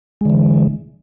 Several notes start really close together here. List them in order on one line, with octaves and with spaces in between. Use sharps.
G#3 D3 E3